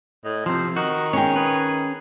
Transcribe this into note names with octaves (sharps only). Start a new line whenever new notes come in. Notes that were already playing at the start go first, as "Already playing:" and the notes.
A2 D#5
C3 F3 C4 C5
D#3 F#4 D#5
C#4 G#4 C#5 G5
G#4 B4